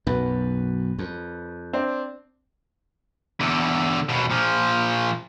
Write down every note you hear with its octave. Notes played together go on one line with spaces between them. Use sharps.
B1 F#2 B4
F2
C4 D4
E2 D3
D#2 B2
A#2 F3